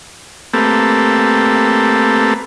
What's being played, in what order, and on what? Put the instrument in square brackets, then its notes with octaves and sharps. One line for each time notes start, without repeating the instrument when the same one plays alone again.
[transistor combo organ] A3 A#3 C4 G4 A4 B4